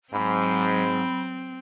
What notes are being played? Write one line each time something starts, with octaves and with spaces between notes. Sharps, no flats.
G#2 F#3 C4 B5